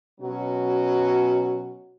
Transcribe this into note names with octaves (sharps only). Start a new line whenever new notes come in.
B2 F#3 C#4 F#4